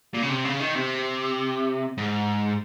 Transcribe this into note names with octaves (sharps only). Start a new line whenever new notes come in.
A#2
C#3
C3
C#3
D#3
C3
G#2